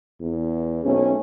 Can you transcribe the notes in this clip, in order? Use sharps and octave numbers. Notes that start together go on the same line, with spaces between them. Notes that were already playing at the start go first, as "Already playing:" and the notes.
E2
B1 A3 C4 C#4